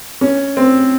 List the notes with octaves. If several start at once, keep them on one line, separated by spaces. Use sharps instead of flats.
C#4
C4